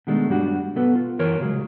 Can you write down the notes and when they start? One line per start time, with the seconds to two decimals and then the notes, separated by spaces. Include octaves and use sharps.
0.07 B2 D#3 G#3 A3 D4
0.29 G2 F#3 G3 D4 F#4
0.76 B1 B3 A4 B4
0.95 F4
1.19 F#2 E3 A#4 C#5 C6
1.39 C2 A#2 C#3 F#3 G#3